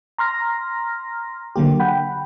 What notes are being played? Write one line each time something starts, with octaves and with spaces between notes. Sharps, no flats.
A#5 C6 F6 A#6
D3 F#3 A#3 G4
F#5 G5 B5